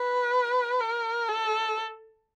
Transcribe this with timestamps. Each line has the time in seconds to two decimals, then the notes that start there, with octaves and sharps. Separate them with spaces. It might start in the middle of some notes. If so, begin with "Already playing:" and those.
Already playing: B4
0.80 A#4
1.29 A4